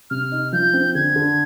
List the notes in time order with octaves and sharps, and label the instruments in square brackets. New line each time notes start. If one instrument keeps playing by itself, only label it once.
[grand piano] C3 [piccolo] F6
[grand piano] D#4
[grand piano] F3 [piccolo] G6
[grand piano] C4
[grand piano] D3 [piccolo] G#6
[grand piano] D3